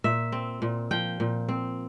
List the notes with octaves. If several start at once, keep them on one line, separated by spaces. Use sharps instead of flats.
A#2 E5
C4
A#2
F3 G5
A#2
C4